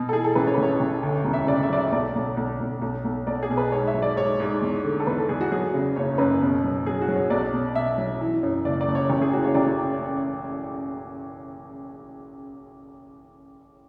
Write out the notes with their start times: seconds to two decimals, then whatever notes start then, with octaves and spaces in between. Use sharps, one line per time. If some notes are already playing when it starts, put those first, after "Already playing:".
Already playing: B2
0.09 A4
0.13 E3 G#4
0.24 A4
0.35 A1 B4
0.47 C#5
0.54 B4
0.58 A1 C#5
0.80 A1
1.03 D2
1.25 E1
1.33 E5
1.47 C#3 D5
1.63 E5
1.69 F#3 D5
1.77 E5
1.92 B1 D5
2.15 B1
2.37 B1
2.60 B1
2.82 B1
3.05 B1
3.27 B1 D5
3.43 G#4
3.50 B2
3.57 B4
3.72 G#2 C#5
3.87 E5
3.94 F#3
4.02 D5
4.16 G#2 C#5
4.40 G#2
4.62 E2
4.84 D3
5.00 A4
5.07 E2 B4
5.18 A4
5.29 E2 G#4
5.41 F#4
5.52 F#3 G#4
5.74 C#3
5.96 F#1 C#5
6.18 F#2 B4
6.42 B2
6.64 F#3
6.86 F#3 G#4
7.01 F#4
7.08 F#3
7.16 C#5
7.30 B1 D5
7.53 B2
7.75 B2 E5
7.98 F#3
8.21 E3
8.43 F#2
8.65 F#1 D5
8.81 D5
8.88 F#1
8.95 C#5
9.10 A1
9.22 G#4
9.33 E3 F#4
9.44 C#5
9.54 A1 D5